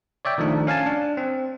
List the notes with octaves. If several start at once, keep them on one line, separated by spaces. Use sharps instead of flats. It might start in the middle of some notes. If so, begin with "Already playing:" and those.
C#5 D5 E5 G5
D#3 F3 A3 D4 D#4
C#4 F5 G#5 A5
D4
C4